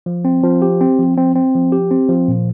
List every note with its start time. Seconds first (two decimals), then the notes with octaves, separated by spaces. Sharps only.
0.06 F3
0.25 C4
0.44 F3
0.62 G4
0.81 C4
0.99 F3
1.17 C4
1.35 C4
1.55 F3
1.72 G4
1.91 C4
2.09 F3
2.28 A#2